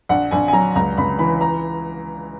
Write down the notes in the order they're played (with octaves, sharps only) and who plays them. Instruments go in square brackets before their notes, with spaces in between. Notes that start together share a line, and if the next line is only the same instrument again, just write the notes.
[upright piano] A#1 F#5
A#1 G#5
G#5
F#3 A#5
C#2 A#5
C#2 B5
E3 B5
A#5